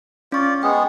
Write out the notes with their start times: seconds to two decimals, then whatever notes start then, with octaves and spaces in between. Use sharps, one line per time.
0.32 C#4 F4 D5 C#6
0.63 G#3 B3 G#4 G5